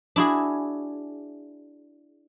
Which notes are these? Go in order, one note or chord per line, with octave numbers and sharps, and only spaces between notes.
D4 E4 F#4 G#4